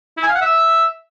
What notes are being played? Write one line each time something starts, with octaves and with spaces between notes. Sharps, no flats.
E4
G#5
F5
F#5
E5